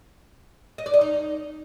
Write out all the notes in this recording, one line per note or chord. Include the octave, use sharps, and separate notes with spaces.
D#5
D5
D#5
D#4